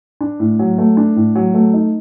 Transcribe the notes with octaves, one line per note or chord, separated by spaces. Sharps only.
D4
A2
F#3
A3
D4
A2
F#3
A3
D#4